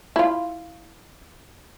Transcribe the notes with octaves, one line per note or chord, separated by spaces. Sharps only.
E4 F4